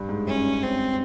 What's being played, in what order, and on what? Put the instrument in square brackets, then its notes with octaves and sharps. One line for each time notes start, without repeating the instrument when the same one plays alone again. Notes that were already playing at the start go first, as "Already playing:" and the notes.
Already playing: [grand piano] G2
G#2
[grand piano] F#2 [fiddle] C#4
[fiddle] C4